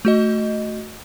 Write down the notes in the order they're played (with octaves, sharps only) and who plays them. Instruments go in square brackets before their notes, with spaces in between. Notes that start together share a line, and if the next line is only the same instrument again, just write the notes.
[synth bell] A3 F#4 D#5